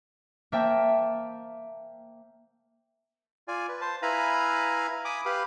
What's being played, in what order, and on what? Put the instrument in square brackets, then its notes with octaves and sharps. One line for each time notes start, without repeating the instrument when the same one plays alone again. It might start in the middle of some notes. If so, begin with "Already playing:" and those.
[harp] A#3 C5 E5 G5 A5
[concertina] F4 D5 G#5
B4
C5 A5
E4 B4 F5 G#5 A#5 B5
G#5 B5 D6 D#6
G4 B4 F5 B5